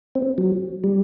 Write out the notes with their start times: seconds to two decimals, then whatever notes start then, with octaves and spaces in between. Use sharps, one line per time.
0.15 C4
0.38 F#3
0.84 G3